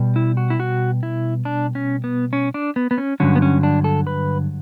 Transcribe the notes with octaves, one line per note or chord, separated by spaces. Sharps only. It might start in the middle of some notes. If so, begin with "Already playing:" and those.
Already playing: B2 G3
E4
F#4
E4
F#4
E4
D4
C#4
B3
C#4
D4
B3
B3
C#4
G2 D3 F#3 C#4
B3
C#4
D4
A4
B4